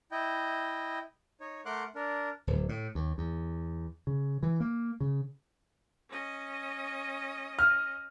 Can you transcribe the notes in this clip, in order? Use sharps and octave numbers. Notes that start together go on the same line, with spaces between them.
E4 D#5 G5
D#4 C#5
A3 A#4 F#5 C6 D6 F#6
D4 A#4
D1
A2
D#2
E2
C#3
E3
A#3
C#3
C#4 D#5
F6